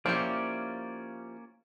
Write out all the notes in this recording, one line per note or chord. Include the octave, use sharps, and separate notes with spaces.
F3 A#3 C#4 E4 G4 D5